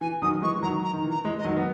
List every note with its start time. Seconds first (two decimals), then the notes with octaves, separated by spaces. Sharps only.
0.01 E3 G#5
0.22 D#3 F#3 D#6
0.42 E3 G#3 C#6
0.58 E3
0.62 D#3 F#3 A#5
0.83 A#5
0.93 D#3
1.04 E3
1.11 A#5
1.24 E3 G#3
1.38 D#5
1.45 D#3 F#3
1.56 B3